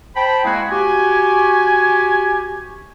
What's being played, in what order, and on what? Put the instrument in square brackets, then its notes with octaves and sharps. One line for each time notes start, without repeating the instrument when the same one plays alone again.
[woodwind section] C5 G5 A5 B5
G#3 A#3 C4 E4 F#4 G#4
F#4 G4 G#5